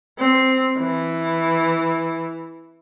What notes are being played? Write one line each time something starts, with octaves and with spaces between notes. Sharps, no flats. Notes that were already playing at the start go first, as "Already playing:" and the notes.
C4
E3